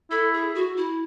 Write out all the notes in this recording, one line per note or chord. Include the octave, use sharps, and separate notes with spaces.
E4 A4
G#4
F#4
E4